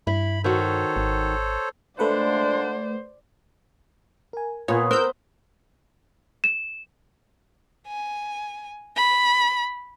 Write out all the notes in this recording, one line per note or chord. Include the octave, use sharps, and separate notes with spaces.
G2 E4 B5
D#3 F#4 A4 C5 C#5
G#1
A#2 G#3 A3 D4 B4 C5 D5 F#5
A#4 G#5
A#2 B3 F4 C#5 G#5
A#4 C5 E6 F#6 G6
E7
G#5
B5